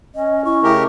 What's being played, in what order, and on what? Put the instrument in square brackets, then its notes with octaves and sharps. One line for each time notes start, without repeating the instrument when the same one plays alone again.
[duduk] C#4 [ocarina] D#5
[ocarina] E4 [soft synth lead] C#6
[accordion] C#3 G4 A#4 [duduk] A3